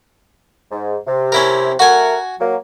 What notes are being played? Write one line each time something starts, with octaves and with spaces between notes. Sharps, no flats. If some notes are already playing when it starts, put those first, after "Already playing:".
G#2
C3
C#4 E4 A#4
A3 F#4 A#4 F#5 G#5
F#3 A#3